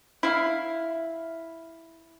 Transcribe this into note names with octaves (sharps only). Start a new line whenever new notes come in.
E4 F5